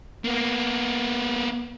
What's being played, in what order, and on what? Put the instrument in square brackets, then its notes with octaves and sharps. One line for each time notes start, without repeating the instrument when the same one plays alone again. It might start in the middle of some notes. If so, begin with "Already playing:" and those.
[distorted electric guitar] A#3 B3